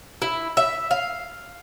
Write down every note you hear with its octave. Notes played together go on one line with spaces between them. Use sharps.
E4
E5
F5